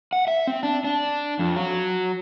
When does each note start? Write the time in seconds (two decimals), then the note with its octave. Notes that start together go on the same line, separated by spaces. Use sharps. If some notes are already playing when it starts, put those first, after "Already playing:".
0.13 F#5
0.28 E5
0.47 C4
0.63 D4
0.84 D4
1.39 F2
1.56 F#3